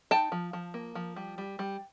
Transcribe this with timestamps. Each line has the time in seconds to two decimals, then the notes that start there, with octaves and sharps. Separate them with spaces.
0.11 D#4 G5 A5
0.32 F3
0.53 F3
0.74 A#3
0.95 F3
1.16 G3
1.38 G3
1.59 G3